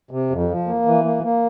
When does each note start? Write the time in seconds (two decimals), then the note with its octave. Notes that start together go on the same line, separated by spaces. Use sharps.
0.11 C3
0.30 F2
0.49 F3
0.67 A#3
0.86 E3
1.05 A#3
1.23 A#3